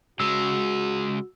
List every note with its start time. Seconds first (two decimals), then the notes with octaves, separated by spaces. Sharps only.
0.20 C#3 G#3 F#4 E6